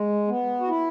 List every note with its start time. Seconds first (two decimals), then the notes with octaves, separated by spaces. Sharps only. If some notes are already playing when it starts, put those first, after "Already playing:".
Already playing: G#3
0.28 B3
0.60 F#4
0.68 E4